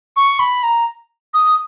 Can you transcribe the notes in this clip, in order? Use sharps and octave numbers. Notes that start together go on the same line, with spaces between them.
C#6
B5
A#5
D#6